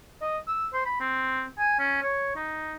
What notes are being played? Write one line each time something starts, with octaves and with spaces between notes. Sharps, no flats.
D#5
E6
C5
B5
C4
G#5
C#4
C#5
D#4